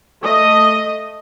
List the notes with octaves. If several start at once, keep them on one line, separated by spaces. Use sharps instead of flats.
A3 D#5